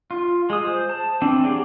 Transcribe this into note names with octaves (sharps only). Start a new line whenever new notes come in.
F4
G#3 D#6
C5
A5
E3 C4 D4
F#3 G4 G#4 D6